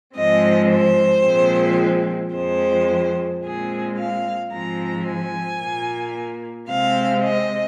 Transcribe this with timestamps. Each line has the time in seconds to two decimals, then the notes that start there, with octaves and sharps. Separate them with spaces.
0.16 G#2 F3 G#3 C4 D#5
0.71 C5
1.26 A#2 F3 G#3 C4
2.34 F2 F3 G#3 C4 C5
3.43 A#2 G#3 C4 G#4
3.98 F5
4.52 G#2 F3 G#3 C4 A#5
5.07 G#5
5.61 A#2 A#3
6.70 C3 G#3 C4 F5
7.24 D#5